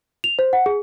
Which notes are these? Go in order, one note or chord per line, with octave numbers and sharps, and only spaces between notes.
F7
C5
F#5
G#4